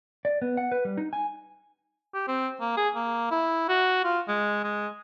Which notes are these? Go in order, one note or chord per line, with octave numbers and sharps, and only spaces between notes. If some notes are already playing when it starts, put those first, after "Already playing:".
D5
B3
F#5
B4
G3
D#4
G#5
G4
C4
A#3
G#4
A#3
E4
F#4
F4
G#3
G#3